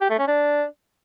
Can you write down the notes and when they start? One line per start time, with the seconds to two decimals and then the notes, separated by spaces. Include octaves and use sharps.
0.01 G4
0.10 A3
0.19 C#4
0.28 D4